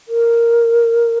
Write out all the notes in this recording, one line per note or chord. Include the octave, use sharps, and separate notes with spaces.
A#4